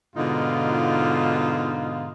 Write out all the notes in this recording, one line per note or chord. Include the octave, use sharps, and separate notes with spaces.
G#2 B2 D3 D#4 F4